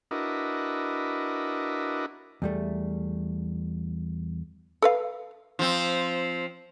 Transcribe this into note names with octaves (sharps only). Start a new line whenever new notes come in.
D4 E4 F#4 A#4 B4 D#5
E2 G3 A3
A4 B4 F5
F3 C4